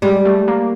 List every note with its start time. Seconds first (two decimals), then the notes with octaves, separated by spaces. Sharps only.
0.02 G3 G#3
0.25 A3
0.48 A#3